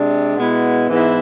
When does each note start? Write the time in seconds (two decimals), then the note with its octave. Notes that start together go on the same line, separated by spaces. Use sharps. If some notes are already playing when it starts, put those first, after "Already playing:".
Already playing: C3 G#3 D4
0.37 B2 G#3 B3 E4
0.89 G#2 E3 G#3 B3 E4